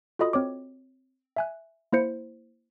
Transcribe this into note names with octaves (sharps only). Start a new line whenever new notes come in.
F4 F#4 A4 D#5 B5 D#6
C4 C#5 D6
E5 G#5 F#6
A#3 E4 C5 C#7